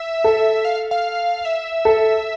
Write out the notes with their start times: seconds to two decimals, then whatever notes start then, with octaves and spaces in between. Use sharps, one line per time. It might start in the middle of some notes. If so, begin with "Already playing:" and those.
Already playing: E5
0.24 A4
0.65 F5
0.91 F5
1.45 E5
1.85 A4